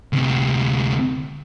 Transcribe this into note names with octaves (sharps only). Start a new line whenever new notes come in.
D2 C3